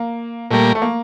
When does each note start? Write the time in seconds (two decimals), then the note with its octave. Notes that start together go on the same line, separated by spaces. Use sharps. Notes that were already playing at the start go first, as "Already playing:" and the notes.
Already playing: A#3
0.51 A#2 G3 A3 A#3
0.75 A3
0.82 A#3